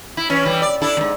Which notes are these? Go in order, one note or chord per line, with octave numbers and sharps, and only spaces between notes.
E4
E3 C#4
E3 G3
D5
D4 E4 A4
E2 G#2